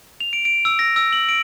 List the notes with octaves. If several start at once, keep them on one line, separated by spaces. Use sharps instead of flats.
F7
D7
D7
E6
A#6
E6
F#7
D7